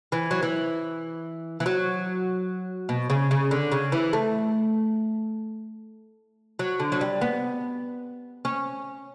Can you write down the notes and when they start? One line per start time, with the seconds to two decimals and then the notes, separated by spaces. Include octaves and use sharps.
0.12 E3
0.31 F#3
0.43 E3
1.60 E3
1.66 F#3
2.89 B2
3.10 C#3
3.31 C#3
3.51 D3
3.72 C#3
3.92 E3
4.13 A3
6.59 F#3
6.80 D3
6.92 F#3
7.01 G3
7.21 B3
8.45 C#4